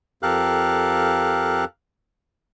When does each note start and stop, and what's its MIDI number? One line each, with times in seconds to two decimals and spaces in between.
0.23 1.65 41
0.23 1.65 67
0.23 1.65 69
0.23 1.65 70
0.23 1.65 77
0.23 1.65 90